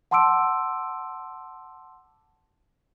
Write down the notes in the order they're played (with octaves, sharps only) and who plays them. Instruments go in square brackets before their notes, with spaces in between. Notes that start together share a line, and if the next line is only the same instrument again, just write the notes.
[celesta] F#5 A5 C6 D6 E6 D7